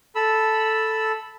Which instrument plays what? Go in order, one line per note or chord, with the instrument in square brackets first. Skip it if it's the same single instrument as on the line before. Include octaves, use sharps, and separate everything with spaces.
[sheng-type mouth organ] A4 B5 E6